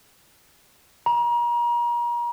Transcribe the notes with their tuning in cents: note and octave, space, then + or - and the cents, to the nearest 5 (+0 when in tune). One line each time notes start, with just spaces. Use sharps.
A#5 +35